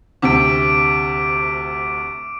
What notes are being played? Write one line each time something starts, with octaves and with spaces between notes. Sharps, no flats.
D2 C3 D6 D7